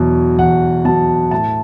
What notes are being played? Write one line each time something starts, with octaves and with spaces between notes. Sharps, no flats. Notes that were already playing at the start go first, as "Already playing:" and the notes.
Already playing: E2 B2 F#3
E2 F#5
B2 F#3 A5
A2 A5